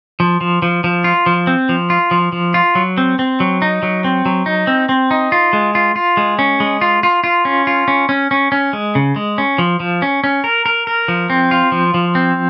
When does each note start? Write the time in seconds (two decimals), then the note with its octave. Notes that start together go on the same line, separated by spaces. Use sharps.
0.20 F3
0.41 F3
0.62 F3
0.84 F3
1.04 F4
1.26 F3
1.47 C4
1.69 F3
1.90 F4
2.11 F3
2.33 F3
2.54 F4
2.75 F#3
2.98 C4
3.19 C4
3.40 F#3
3.62 D#4
3.83 F#3
4.04 C4
4.26 F#3
4.46 D#4
4.67 C4
4.89 C4
5.11 D#4
5.32 F4
5.53 G#3
5.75 F4
5.96 F4
6.17 G#3
6.39 C#4
6.60 G#3
6.81 F4
7.03 F4
7.24 F4
7.45 C#4
7.67 F4
7.88 C#4
8.09 C#4
8.31 C#4
8.52 C#4
8.73 G#3
8.95 C#3
9.16 G#3
9.38 C#4
9.58 F3
9.80 F3
10.02 C#4
10.24 C#4
10.44 A#4
10.66 A#4
10.87 A#4
11.08 F3
11.30 C4
11.51 F4
11.72 F3
11.94 F3
12.15 C4